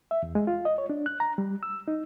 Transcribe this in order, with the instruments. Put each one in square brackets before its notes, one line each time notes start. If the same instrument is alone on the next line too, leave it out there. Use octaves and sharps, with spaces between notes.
[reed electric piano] E5
E2
G#3
F4
D#5
C#5
D4
F#6
A#5
G3
E6
D#4